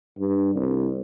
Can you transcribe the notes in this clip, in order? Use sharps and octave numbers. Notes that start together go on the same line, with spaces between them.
G2
C2